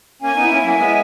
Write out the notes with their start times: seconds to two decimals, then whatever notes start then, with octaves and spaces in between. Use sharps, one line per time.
0.22 A#3 C#4 G#5
0.36 B3 D#4 E4
0.49 A#3 C#4
0.59 F#3 A#3 G#5
0.77 G#3 B3 E5